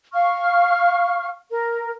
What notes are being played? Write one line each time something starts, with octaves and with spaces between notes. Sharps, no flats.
F5 C#6 F6
A#4